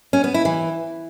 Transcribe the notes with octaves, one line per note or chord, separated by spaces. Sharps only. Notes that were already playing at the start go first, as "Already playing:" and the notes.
C#4
B3
E4
E3